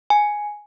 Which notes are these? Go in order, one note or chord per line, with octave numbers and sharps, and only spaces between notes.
G#5